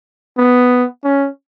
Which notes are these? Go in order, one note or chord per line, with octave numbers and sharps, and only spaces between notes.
B3
C#4